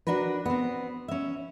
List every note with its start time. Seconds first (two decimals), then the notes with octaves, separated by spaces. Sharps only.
0.07 D4 F#4 A#4 B4
0.46 B3 C4
1.08 C#4 E5